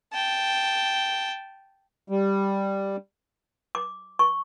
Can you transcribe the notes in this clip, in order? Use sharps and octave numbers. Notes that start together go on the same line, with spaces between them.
G5 A5
G3
D6
C#6